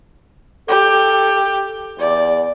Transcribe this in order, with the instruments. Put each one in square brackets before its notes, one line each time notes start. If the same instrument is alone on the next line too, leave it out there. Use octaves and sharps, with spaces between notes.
[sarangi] G4 [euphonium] A4
[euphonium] E2 [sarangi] D5